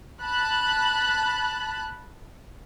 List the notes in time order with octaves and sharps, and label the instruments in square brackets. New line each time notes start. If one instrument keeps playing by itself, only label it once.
[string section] A5 B5 F#6